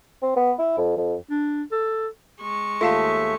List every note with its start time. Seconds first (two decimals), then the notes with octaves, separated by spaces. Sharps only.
0.22 C4
0.36 B3
0.59 E4
0.77 F2
0.97 F2
1.30 D4
1.72 A4
2.41 G#3 C#6
2.81 D#2 A3 F4 A4 E5 F5 A5